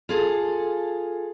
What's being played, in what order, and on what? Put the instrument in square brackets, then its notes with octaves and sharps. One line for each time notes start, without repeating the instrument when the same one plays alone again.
[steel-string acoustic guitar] F4 G#4 A4